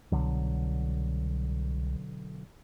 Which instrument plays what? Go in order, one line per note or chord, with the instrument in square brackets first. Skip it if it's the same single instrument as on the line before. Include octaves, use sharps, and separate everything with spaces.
[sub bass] C2 [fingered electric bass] B2 D3 F#3